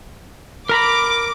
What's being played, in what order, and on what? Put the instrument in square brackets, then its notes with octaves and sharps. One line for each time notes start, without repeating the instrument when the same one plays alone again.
[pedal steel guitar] A#4 A#5 B5 [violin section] D6